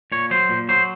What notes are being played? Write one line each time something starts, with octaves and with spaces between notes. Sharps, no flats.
A#2 C#5
F#3 C5
A#2
F#3 C5